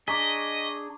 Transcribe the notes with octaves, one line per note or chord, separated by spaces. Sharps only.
D4 G#4 D#5 A#5 C#6 D6 B6